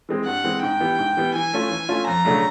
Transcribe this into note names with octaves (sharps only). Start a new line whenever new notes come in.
E3 G#3 C4
G2 F#5
E3 G#3 C4
G#2 G5
E3 G3 B3
G#2
E3 G3 B3
E3 G#5
A3 C#4 F4
E3
A3 C#4 F4
F2 A#5
C#3 F#3 A3 D4